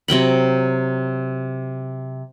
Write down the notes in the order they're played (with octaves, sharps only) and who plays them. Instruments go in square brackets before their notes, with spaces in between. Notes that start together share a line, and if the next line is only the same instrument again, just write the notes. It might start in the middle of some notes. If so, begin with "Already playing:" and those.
[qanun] C3 F#3 G5 B5